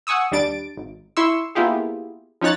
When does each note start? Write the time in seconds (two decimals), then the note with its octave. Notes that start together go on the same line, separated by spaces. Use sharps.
0.07 F#5 G#5 C#6 D#6 E6
0.32 D#2 G3 D4 A6 D7
0.77 G#1
1.17 E4 C6 C#6 E6
1.55 A#3 B3 E4 F4 G4 G#4
2.41 F3 C#4 D#4 C#5 F#6 A6